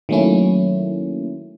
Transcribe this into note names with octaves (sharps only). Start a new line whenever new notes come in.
D#3 F#3 A3 A#3 C#4 E4